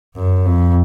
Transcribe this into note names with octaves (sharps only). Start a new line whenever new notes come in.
F#2
F2